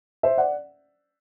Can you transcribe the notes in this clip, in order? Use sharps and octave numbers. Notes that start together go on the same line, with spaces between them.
C5 E5
D5 F#5